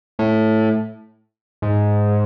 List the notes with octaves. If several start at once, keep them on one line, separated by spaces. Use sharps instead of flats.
A2
G#2